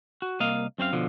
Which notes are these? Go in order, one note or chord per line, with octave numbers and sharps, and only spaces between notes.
F#4
C2 A#3 D#5 F5
F#2 C4 C5 F5
B2 D3 F3